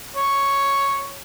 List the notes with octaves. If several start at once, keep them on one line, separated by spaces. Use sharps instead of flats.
C#5